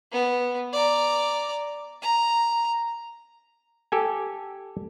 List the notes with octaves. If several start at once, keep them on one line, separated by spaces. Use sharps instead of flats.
B3
D5 A#5
A#5
G4 A4 G#5